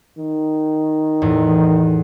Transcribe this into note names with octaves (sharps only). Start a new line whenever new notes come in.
D#3
E2 A2